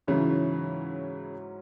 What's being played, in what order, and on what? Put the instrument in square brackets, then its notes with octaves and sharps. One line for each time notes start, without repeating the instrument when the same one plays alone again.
[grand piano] G#2 F#3 C#4 E4 [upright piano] C#3 E3